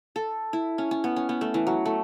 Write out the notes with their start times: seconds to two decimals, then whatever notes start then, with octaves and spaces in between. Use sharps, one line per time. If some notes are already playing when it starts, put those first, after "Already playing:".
0.16 A4
0.53 E4
0.78 C#4
0.91 C#4
1.04 B3
1.16 C#4
1.29 B3
1.41 A3
1.54 E3
1.67 F#3
1.85 A3